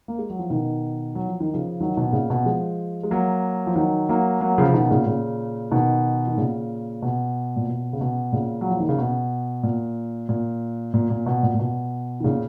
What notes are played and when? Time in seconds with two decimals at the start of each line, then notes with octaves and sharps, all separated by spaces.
0.08 A#3
0.18 G#3
0.30 F#3
0.39 F3
0.50 B2 D#3
1.15 F#3
1.28 F3
1.40 D#3
1.53 C#3 F3
1.80 D#3 F#3
1.97 B2 D#3
2.12 A#2 C#3
2.30 B2
2.45 F3 G#3
3.03 G#3
3.11 F#3 A#3
3.67 F3
3.76 D#3 F#3
4.09 F#3 A#3
4.41 F#3 A#3
4.58 C#3 F3
4.68 C#3
4.74 B2 D#3
4.90 A#2 C#3
5.06 A#2 C#3
5.71 B2 D#3
6.28 D#3
6.37 A#2 C#3
7.02 B2
7.56 A#2
7.68 B2
7.93 C#3
8.01 B2
8.32 A#2 C#3
8.61 F#3
8.70 F3
8.80 D#3
8.89 C#3
8.98 B2
9.63 A#2
10.29 A#2
10.94 A#2
11.10 A#2
11.26 B2
11.43 A#2
11.54 A#2
11.59 B2
12.20 D#3
12.24 A#2 C#3